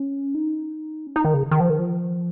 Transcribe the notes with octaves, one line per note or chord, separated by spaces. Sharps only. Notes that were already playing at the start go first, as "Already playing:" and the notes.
Already playing: C#4
D#4
C#4
D#4
D#3
C#3
D#3
F3
D#3
F3